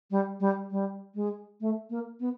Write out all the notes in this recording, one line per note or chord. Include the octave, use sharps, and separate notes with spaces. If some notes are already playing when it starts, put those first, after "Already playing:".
G3
G3
G3
G#3
A3
A#3
B3